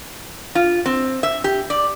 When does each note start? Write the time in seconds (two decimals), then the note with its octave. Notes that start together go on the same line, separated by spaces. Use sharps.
0.55 F4
0.86 C4
1.23 E5
1.44 G4
1.70 D5